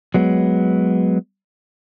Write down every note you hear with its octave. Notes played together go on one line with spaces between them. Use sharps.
F#3 G#3 B3